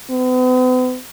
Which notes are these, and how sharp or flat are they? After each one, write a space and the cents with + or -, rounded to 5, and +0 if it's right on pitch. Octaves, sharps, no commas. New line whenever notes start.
B3 +45